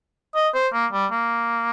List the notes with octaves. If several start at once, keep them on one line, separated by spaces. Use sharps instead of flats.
D#5
C5
A#3
G3
A#3